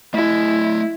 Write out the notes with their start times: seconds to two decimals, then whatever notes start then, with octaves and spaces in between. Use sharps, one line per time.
0.14 A3 E4 D#5